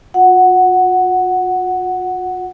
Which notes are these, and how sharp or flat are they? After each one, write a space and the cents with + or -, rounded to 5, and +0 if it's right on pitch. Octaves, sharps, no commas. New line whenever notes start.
F4 +45 F#5 +0